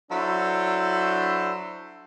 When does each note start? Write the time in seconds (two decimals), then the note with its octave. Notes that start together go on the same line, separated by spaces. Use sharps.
0.11 F#3 D4 E4 A4 C5